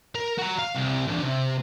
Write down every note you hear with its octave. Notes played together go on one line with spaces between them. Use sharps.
A#4
F#4 A#5
F5
C2
E3 D4
C3